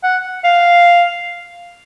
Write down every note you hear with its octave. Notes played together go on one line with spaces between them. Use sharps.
F#5
F5